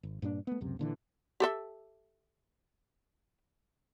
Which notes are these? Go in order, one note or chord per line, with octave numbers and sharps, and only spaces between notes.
G#1
G2 A#2 C#4 D4
A3 B3
C#2 F#2 C3
A#2 D3 E3
G4 A4 E5